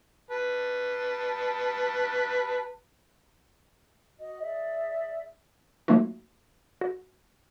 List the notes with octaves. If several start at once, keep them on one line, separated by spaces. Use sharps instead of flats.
B4 A5
F#4 D#5
G#4 D5 E5
F#3 A3 A#3 D#4 F4 F#4
F#4